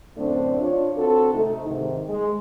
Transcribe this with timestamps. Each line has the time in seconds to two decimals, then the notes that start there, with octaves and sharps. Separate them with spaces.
0.16 F#2 A2 D3 A3 C4 D4
0.60 D4 F4 C#5
0.97 D3 C4 F#4 A4
1.33 C3 A3 D#4
1.65 G#2 C3 D#3
2.09 G#3